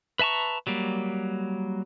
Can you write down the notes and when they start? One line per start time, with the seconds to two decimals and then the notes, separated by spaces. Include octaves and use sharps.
0.19 B4 E5 A5 A#5 C#6
0.67 F#3 G3 A#3